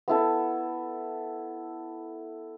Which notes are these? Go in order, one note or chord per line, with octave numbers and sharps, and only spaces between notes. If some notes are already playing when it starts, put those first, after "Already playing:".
B3 E4 A4